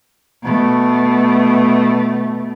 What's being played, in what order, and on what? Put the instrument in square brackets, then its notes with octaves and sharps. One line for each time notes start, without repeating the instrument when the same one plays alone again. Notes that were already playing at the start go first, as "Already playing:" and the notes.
[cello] B2 A3